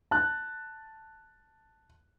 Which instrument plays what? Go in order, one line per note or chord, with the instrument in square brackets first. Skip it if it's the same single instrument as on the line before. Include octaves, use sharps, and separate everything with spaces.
[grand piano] A5 F#6